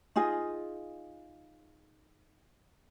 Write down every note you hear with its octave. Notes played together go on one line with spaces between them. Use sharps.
D#4 F4 G#4 D#5